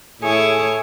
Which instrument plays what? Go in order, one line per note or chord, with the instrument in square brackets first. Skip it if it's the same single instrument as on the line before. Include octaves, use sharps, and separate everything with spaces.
[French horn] A2 [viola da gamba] E4 C#5 [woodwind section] G#4 G#5